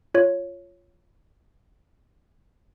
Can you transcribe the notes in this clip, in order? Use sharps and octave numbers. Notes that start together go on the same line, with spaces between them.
F4 C#5